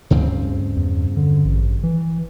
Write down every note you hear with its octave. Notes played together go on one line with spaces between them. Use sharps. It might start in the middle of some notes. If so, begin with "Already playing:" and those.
D2 G2 C#3 C4
E2
D3
A1
E3